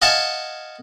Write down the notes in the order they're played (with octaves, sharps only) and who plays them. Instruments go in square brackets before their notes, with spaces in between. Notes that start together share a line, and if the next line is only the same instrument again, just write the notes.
[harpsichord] D#5 F5 F#5 G#5 A5